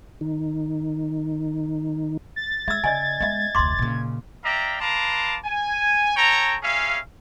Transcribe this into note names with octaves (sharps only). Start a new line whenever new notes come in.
D#3 D#4
A6
G#3 E5 E6 G#6
C#3 D5 D#5 G#5
G#3 B3 D#5 E5
F1 D2 C6 D6
A#2 C#3
D5 E5 F5 G5 A#5
B4 F5 A5 A#5 C6 D6
G#5
A4 C#5 G5 A#5
G3 C#4 G#4 E5 F5